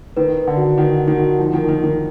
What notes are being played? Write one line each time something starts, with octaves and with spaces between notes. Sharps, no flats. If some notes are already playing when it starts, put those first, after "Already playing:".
D#3 B4
B4
D3
F#4
D#3 F#5
F#5
D#3
F#4
F3 D#4
D#3
A#4
D#3
D#3 A#4